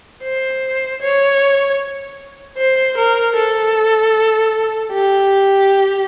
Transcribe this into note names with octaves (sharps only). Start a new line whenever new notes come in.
C5
C#5
C5
A#4
A4
G4